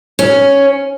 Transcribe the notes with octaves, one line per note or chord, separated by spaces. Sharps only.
C#4